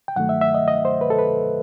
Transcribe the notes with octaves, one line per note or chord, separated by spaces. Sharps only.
G5
G2 D#3 F#3 A3 F#5
E5
E5
D#5
D#5
C5
B4
A4
B4